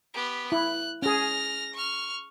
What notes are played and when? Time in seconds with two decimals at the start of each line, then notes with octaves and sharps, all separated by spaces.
0.14 B3 G4
0.52 E4 F#6
1.02 C#4 G#4 F6 A#6
1.74 C#6 F6